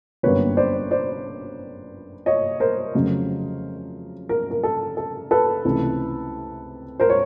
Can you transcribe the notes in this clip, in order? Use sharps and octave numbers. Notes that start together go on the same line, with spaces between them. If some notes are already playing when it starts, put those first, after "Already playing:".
G1 F#2 D3 G3 A#3 B4 C#5
C5 D5
C5 D5
C#5 D#5
A#4 C5
F2 C#3 F#3 A3
A#4
A#4
A4
A4
A4 B4
C#2 C3 E3 A3
A#4 C5
C#5